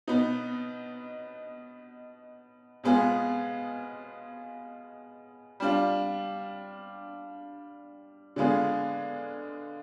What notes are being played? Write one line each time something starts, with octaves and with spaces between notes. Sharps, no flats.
B2 B3 D#4
B2 G#3 B3 F4 G#4
G3 D4 F4
D3 G#3 B3 F4 G#4